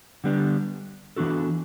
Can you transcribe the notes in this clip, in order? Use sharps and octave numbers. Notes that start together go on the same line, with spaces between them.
D3 G3 B3 D4
E3 B3 D4 F#4 A4